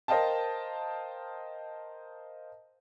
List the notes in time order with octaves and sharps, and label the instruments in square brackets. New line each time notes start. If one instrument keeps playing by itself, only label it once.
[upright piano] A#4 C5 D#5 F5 G5 A5